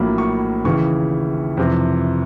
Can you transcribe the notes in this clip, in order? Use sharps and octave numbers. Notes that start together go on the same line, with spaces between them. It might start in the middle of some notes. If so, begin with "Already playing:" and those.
Already playing: A#1 A2 F#3 A#3 B5
C#6
D#2 C#3 E3 C#6
F2 C3 E3